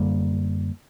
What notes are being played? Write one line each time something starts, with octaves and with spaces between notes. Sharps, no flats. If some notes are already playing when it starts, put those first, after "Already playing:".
Already playing: F#2 D3 G3 A#3